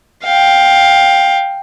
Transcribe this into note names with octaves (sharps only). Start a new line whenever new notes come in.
F5 G5